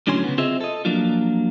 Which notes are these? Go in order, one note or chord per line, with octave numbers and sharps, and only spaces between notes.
A2 D3 F#3 C#4 G#5 C6
C#3 B3
C4 F4 G#4 C5 D#5 E5
A4 D#5
F3 F#3 A#3 D4 F4